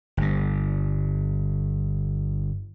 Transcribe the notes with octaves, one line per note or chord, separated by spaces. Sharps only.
G1 G2